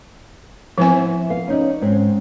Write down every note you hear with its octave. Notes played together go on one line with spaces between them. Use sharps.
F3 B3 C4 E4 C5 G#5
B3 F5
C#4 D#4 D5
G#2 C4 C#4